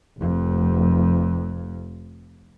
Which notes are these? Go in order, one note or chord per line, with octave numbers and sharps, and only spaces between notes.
F1 F2